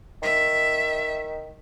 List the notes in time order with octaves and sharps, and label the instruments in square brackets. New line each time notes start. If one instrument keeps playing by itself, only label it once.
[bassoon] D#3 [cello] E5